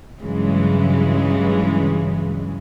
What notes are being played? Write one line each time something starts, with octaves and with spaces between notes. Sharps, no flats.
G2 C#3 E3 F#3 G#3